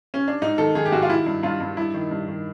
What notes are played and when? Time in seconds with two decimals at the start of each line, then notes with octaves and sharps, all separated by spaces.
0.14 C#4
0.28 D4
0.42 G#2 D#4
0.58 D#3 A4
0.75 D#3 G#4
0.86 G4
0.92 G#2 F#4
1.02 F4
1.10 D#3 E4
1.26 G2
1.43 G2 F4
1.60 G2
1.77 G2 E4
1.94 D#3
2.11 G2
2.28 D#3